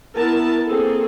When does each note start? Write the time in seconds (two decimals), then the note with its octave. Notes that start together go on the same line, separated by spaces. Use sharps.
0.15 B3 E4 A#4 A5
0.67 A#3 C4 G#4 A4